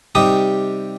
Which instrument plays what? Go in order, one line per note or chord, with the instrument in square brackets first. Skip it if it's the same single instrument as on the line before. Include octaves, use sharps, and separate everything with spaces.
[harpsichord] C3 G3 D#4 G4 D#6